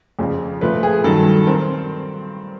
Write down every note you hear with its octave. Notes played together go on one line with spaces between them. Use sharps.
F2 C#3 F3
A#2 F3 A3 B4
G#4
G2 D#3 F#3 A4
C4 A#4